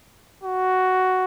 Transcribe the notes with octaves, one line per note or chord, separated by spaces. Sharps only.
F#4